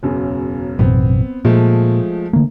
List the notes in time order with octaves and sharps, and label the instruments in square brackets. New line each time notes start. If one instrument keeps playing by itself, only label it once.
[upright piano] E1 F#2 C#3
[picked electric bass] A1 F#2 B2 [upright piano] B3 C4
[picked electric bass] A#2 [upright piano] F3 G#3 A3
[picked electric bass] D3 A3 A#3